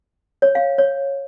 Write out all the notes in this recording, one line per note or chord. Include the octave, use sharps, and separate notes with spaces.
C#5
F5
C#5